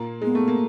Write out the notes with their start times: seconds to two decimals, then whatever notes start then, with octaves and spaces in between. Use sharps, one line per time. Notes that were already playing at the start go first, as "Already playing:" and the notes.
Already playing: A#2 A#3
0.22 G#3 B3
0.35 A3
0.48 A#3